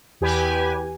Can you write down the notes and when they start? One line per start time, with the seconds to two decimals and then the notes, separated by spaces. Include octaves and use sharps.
0.21 E2 G4 B4 G#5